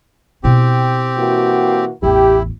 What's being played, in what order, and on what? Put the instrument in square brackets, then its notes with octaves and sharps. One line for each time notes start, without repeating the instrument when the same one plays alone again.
[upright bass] B2 E4 [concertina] C4 G4
[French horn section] E3 A#3 F#4
[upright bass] A1 E2 [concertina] E4 [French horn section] G4